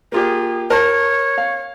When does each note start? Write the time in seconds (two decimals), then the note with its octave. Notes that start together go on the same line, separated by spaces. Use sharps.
0.12 A#3 F4 G4 G#4
0.70 A#4 C#5 A5 A#5
1.38 F5